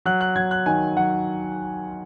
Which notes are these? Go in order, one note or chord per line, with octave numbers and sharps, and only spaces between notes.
F#3 F#6
F#6
F#3 G#6
F#6
D#3 G#5
F#3 F#5